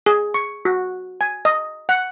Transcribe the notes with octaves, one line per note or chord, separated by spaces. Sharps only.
G#4
C#6
F#4
G#5
D#5
F#5